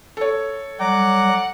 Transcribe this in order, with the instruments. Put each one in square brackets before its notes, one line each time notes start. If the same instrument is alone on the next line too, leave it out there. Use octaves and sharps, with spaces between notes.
[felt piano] A4 C#5
[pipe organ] F#3 G3 [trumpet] F#5 [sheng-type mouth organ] A#5 D6